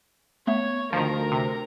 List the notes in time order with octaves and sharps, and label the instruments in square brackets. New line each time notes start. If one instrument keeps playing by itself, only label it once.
[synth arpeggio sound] A3 B3 E5 [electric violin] C#5
[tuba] D2 [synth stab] D#3 F3 [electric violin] A#4 A#5
[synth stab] C3